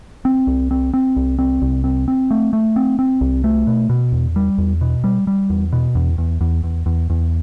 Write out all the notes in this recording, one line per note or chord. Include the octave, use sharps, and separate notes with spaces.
C4
C2
C4
C4
C2
C4
C2
C4
C4
A3
A3
C4
C4
C2
A3
B2
B2
E2
G3
E2
B2
G3
G3
E2
B2
E2
E2
E2
E2
E2
E2